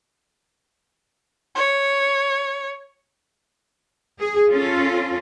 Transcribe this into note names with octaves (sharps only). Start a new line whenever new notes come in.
C#5
G#4
C#4 F4 A4